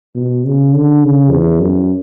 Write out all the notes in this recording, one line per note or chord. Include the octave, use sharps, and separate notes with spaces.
B2
C#3
D3
C#3
E2
F#2